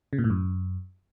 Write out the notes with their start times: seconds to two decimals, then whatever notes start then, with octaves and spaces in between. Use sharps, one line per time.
0.13 C#3
0.18 A#2
0.24 A2
0.30 F#2